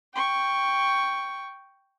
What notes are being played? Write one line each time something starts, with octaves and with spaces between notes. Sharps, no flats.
G5 C#6